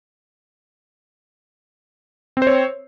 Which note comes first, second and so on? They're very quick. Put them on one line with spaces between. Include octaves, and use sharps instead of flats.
C4 C5 C#5